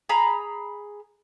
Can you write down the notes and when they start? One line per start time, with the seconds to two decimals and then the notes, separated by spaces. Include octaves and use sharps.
0.09 G#4 A#5 B5